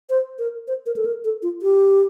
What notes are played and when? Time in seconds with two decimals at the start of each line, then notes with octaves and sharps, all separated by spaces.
0.10 C5
0.39 A#4
0.68 C5
0.86 A#4
0.96 A4
1.05 A#4
1.24 A4
1.42 F4
1.62 G4